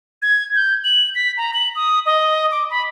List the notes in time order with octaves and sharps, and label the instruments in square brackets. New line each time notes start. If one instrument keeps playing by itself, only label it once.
[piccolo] G#6
G6
F#7
B6
A#5
F#7
D#6
D#5
D6
B5